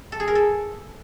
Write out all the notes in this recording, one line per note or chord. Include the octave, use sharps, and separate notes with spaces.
A4
G#4
A#4
A4